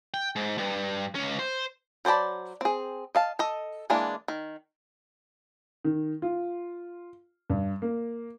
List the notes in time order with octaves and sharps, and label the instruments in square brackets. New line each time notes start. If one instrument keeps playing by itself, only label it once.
[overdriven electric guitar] G5
G#2
G2
C#2 C#4
C5
[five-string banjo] F#3 C5 D5 A5 B5
C4 G#4
D#5 F5 A5
A4 D#5
E3 G#3 A#3 D4
D#3
[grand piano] D#3
F4
G2
A#3